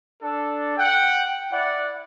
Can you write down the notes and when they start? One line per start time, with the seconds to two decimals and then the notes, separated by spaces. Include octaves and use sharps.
0.22 D4 A4
0.77 F#5 G5
1.52 E4 D5 F#5